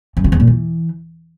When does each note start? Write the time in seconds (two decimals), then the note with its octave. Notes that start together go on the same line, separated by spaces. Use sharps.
0.17 F#2
0.24 C#3
0.32 E2
0.40 A#2
0.47 E3